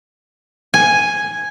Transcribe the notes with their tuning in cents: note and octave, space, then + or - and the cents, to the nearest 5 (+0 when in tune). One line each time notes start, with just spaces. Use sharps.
G#5 +0